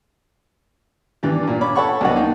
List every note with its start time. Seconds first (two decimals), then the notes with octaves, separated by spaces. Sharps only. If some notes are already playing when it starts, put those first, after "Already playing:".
1.23 G2 E3 D4 G4
1.43 G2 A#2
1.61 C#5 B5 D6
1.76 A4 C#5 F#5 B5 C#6
2.01 C2 F#3 B3 D4 D#5 F#5
2.16 A#3 D#4